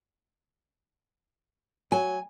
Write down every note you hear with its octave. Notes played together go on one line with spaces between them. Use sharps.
F#3 G#5